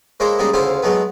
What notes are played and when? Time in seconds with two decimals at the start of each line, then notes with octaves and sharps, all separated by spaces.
0.20 G#3 A#3 E4 C5 C#5
0.39 C#3 G3 G#3 A#3 D#4
0.53 D2 C#3 E4 F4 C5 F5
0.83 F#3 G#3 A3 B3